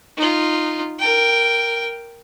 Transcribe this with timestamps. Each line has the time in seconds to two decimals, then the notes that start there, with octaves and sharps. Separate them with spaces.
0.17 D#4 F4
0.99 A#4 G5